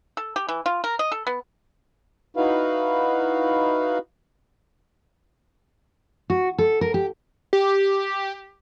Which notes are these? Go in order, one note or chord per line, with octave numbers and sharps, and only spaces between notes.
A4
G4
E3
F4
A#4
D#5
A4
B3
D#4 E4 F#4 B4 F5
F#4
A4
A#4
G4
G4